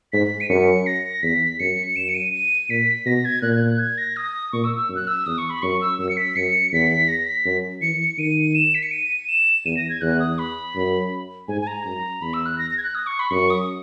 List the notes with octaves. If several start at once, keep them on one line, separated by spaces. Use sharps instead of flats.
G#2 B6
D#7
F#2 C#7
A#6
E2 B6
F#2 C#7
F#2 E7
C#7
D#7
D#7
A#2 B6
B2 A#6
G#6
A#2 F#6
G#6
F#6
G#6
A#6
D#6
A#2 C#6
E6
E6
F#2
F#6
E6
E2 D#6
C#6
B5
F#2 C#6
E6
F#2 E6
C#7
B6
F#2 C#7
E2 B6
A#6
B6
F#2
E3 C#7
C#7
D#3 D#7
E7
B6
C#7
D#7
E7
E2 D#7
A#6
G#6
E2 F#6
D#6
B5
F#2
G#2 G#5
G#5
A#5
F#2
E2 B5
E6
F#6
A#6
A#6
G#6
F#6
D#6
C#6
B5
F#2 C#6
D#6